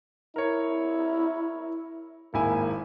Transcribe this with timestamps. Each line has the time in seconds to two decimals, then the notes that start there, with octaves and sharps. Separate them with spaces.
0.36 E4 A#4 C#5
2.34 G#1 A#3 E4 G#5